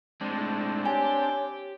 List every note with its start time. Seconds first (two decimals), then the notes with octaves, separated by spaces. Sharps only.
0.21 A2 G#3 C4 D4
0.86 G4 C#5 G#5